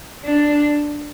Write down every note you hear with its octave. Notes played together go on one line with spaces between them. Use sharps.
D4